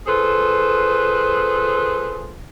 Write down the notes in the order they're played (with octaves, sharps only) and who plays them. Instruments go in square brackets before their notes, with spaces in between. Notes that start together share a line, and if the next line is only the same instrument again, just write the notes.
[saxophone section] F4 G#4 A4 B4 C5